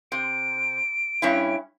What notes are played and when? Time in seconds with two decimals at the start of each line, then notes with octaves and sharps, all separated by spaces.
0.12 C3 D7
1.22 G2 C#4 E4